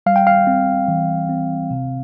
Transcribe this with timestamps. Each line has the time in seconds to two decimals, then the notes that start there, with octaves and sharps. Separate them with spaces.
0.06 G3 F5
0.16 G5
0.27 F5
0.47 C4
0.88 E3
1.29 C4
1.71 C3